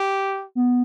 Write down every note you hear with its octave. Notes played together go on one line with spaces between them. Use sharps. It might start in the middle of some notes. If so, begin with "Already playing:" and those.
Already playing: G4
B3